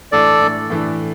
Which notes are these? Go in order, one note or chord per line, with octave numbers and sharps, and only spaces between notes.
A2 E3 A3 D4 A4 D5
A2 E3 A3 D4
A2 E3 A3 D4